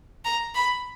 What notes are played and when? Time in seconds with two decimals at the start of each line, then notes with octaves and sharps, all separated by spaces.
0.25 A#5
0.55 B5